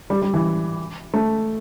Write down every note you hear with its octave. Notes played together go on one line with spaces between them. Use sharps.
G3
G3
E3
A3